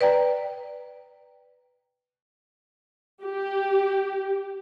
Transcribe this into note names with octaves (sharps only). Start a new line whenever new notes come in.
B4 D5 G5 A#5
G4